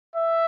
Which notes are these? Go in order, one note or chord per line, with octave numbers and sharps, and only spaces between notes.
E5